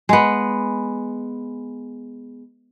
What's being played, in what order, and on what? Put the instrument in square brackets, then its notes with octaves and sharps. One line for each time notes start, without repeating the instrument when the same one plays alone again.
[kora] G#3 B3